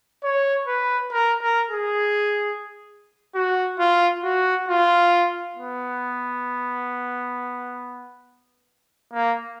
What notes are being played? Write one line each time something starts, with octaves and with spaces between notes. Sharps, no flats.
C#5
B4
A#4
A#4
G#4
F#4
F4
F#4
F4
B3
A#3